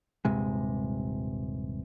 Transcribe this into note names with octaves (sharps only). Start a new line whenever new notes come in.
D#1 G2 C3 G#3